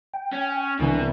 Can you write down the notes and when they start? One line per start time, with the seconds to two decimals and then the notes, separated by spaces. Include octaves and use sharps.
0.14 G5
0.32 C#4
0.79 C2 B2 E3 B3 D4 G#5